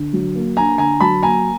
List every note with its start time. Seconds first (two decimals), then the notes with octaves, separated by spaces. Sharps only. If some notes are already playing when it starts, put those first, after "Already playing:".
Already playing: D3
0.13 F#3
0.35 A#3
0.57 D4 G#5 A#5
0.78 D3 G#5 A#5
1.01 F#3 A5 B5
1.23 A#3 G#5 A#5